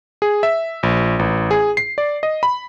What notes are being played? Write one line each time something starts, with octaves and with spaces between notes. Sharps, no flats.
G#4
E5
A#1
A1
G#4
C7
D5
D#5
B5